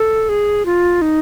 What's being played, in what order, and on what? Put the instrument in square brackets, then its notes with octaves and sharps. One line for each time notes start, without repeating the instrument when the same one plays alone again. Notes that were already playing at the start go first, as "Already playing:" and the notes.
Already playing: [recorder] A4
G#4
F4
D#4